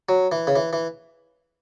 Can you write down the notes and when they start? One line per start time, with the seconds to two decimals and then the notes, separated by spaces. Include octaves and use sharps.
0.09 F#3
0.32 E3
0.47 C#3
0.56 E3
0.73 E3